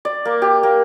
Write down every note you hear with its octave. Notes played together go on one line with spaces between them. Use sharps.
D5
A#3
G4
A#3